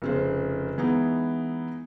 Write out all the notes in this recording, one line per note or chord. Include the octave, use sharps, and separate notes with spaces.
F1 C#3 C5
E3 G#3 B3 D#4